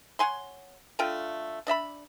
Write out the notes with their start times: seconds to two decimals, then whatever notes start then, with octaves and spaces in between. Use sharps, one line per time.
0.19 C#5 F#5 G#5 C6
0.99 D3 A3 F4 G5
1.67 D4 D#5 E5 B5